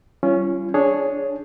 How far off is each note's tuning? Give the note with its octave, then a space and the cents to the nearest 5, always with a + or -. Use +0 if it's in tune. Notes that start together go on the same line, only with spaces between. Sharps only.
G3 -35 C#4 +0 F4 -35
D4 -10 G#4 +0 C#5 +0